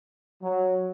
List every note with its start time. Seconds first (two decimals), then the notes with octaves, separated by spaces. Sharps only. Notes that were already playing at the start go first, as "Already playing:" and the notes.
0.42 F#3